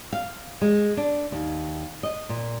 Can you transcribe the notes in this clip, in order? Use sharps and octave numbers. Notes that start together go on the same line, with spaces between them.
F5
G#3
D4
D#2
D#5
A#2